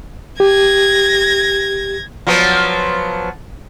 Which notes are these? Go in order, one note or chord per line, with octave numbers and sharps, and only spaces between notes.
G4 G#6 A#6
F3 F#3 B3